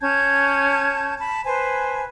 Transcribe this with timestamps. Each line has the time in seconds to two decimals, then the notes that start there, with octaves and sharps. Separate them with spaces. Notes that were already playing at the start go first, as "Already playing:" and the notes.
0.01 C#4 A5 G6 G#6
1.17 A5 B5
1.45 B4 C5 G#5 A5